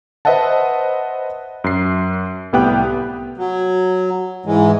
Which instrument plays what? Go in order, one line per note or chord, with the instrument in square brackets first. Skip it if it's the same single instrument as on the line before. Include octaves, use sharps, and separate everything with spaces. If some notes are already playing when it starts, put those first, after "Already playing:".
[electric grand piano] B4 C5 D#5 E5 F#5 A5
F#2 C7
C2 A2 B3 G4 G5 F#6
[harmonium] F#3
G#2 E3 G#3